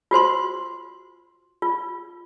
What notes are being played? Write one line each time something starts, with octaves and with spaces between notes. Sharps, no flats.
F4 F#4 C5 C6
F4